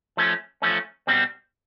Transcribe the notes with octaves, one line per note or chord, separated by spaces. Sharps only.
F3 A3 C#4
F3 A3 C#4
B2 G3 C4